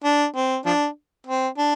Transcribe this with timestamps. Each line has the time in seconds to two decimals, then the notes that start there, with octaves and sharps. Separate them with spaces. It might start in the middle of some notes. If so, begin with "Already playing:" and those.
0.04 D4
0.36 C4
0.66 F3 D4
1.27 C4
1.58 D4